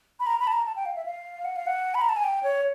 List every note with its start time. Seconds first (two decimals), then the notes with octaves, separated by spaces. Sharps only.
0.20 B5
0.27 A#5
0.40 B5
0.47 A5
0.53 A#5
0.66 A5
0.76 G5
0.86 F5
0.96 E5
1.06 F5
1.45 F#5
1.56 F5
1.67 F#5
1.95 B5
2.02 A#5
2.09 A5
2.16 G#5
2.24 G5
2.43 C#5